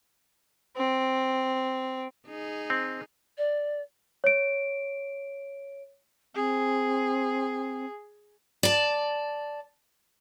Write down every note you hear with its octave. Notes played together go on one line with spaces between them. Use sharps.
C4
D#4 G#4
C4
D5
C#5 D7
C4 G#4
D5 A5